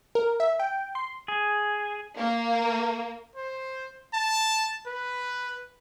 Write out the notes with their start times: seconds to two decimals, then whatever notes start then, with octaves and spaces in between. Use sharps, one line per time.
0.15 A#4
0.40 E5
0.60 G5
0.95 C6
1.28 G#4
2.17 A#3
3.36 C5
4.14 A5
4.87 B4